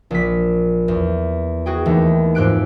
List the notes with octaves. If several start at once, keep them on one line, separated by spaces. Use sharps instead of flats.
A#1 B6
E2
F#4 G#4 G5
D#2 E3 A3
F2 G#2 G4 F#6 D7